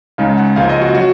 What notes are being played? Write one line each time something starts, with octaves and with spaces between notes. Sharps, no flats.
C#2 C#3 G#3 D#4 F5
F#5
C#2 C#3 F3 A#3 F5
D#5
F#4
F#3 F#4